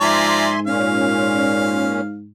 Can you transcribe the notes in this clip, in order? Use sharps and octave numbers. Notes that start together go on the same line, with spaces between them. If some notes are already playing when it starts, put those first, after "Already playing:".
G#2 F3 D5 E5 G#5 A#5 C6
A#2 C#4 F5